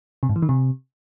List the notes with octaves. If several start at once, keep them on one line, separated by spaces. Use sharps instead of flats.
C3
G#2
E3
D#3
C3